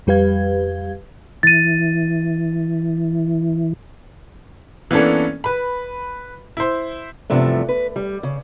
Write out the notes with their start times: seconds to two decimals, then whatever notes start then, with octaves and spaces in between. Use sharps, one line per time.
0.07 F2 G3 G4 B4 F5 G#6
1.43 E3 A6 D#7
4.91 E3 A#3 B3 C#4 D4 A4
5.44 B4 B5
6.57 E4 C5
7.30 E2 G2 C3 F3 A3 D4
7.69 B4
7.96 G3
8.23 C#3